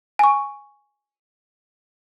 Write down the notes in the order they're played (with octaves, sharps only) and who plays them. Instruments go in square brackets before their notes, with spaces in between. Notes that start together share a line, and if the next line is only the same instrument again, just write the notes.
[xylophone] G#5 C#6